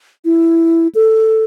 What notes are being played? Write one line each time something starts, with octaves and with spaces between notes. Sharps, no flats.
E4
A4